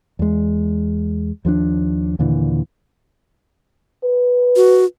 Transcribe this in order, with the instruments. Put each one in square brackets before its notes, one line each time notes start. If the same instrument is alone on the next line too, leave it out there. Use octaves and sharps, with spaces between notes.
[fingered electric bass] E2 G#3
D#2 F3 G3 D4
D#2 A#2 D3 E3
[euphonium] B4
[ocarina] F#4